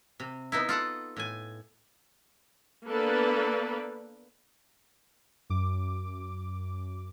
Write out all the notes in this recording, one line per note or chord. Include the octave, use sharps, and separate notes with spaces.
C3
B3 D#4 E4
F4 A4 F#5
A2 G#5
A#3 B3 D4 A4 B4 D5
F#2 D6